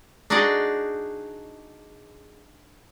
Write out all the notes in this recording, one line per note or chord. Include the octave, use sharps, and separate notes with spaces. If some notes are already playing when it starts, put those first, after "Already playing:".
D4 D#4 F#4 G#4 D5 D#5